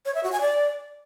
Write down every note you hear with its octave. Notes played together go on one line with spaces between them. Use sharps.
C#5
E5
F#4
G#5
D5